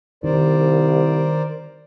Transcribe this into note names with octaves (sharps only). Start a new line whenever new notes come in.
C2 D#3 A#4 C5 D5